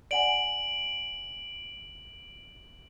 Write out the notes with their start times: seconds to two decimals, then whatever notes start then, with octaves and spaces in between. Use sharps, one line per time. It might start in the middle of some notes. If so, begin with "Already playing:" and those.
0.11 D5 F#5 G#5 D7 F#7